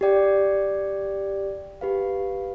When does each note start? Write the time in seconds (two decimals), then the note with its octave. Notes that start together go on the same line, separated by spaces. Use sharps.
0.01 G4 D5 G5
1.81 G4 B4 F5